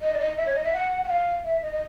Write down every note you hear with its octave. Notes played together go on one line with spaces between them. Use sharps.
D#5
D5
D#5
E5
C#5
D#5
E5
F#5
F#5
F5
E5
D#5
D#5